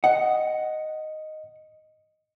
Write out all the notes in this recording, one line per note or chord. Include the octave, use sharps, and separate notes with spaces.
D#5 F#5